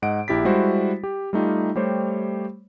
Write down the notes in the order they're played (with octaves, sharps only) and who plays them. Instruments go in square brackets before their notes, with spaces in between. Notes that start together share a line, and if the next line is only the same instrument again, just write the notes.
[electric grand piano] G#2 D#5 F#5 D7
A#1 E4 G4 A6 B6
G3 G#3 E4 F#4 C5
G4
G3 A3 D#4 F4 G4
G3 A3 G4 C5 C#5